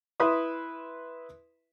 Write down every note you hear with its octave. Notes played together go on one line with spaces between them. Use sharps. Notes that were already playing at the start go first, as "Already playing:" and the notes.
E4 B4 E5 B5 C6 D#6